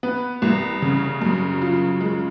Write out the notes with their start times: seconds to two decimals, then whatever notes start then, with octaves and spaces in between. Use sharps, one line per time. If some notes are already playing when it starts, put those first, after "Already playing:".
0.03 B3
0.42 C2
0.82 C#3
1.22 F#2
1.62 F4
2.01 G#3